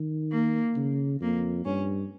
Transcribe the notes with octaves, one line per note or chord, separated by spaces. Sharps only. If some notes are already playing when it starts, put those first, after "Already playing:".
Already playing: D#3
A#3
C#3
F2 A#3
G2 C#4